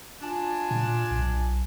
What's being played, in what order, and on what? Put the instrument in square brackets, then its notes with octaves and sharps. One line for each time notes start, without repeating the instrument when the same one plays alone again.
[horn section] D4 F4 G#5
[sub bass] A#2
B1